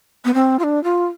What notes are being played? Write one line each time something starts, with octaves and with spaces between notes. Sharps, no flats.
B3
C4
F4
D4
F4